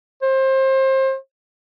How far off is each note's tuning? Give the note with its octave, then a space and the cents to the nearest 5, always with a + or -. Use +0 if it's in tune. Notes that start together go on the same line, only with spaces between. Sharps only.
C5 +25